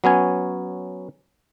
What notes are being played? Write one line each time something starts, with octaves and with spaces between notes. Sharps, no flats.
F#3 B3 C#4 G#5